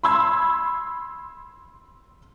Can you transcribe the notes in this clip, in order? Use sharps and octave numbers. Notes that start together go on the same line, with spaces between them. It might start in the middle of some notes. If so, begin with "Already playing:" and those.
B5 C6 E6 G#6